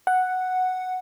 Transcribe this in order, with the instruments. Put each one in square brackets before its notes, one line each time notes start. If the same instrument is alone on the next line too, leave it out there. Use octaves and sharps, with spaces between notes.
[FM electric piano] F#5